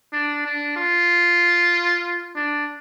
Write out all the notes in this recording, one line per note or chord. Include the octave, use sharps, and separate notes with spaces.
D4
D4
F4
D4